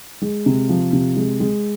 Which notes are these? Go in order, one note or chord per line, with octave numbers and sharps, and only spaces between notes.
G#3
C3
F3
C3
G#3
G#3